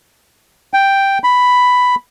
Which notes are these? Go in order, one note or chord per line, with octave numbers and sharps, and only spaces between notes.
G5
B5